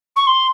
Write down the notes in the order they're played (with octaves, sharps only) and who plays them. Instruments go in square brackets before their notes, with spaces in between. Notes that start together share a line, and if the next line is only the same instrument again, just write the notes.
[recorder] C#6
C6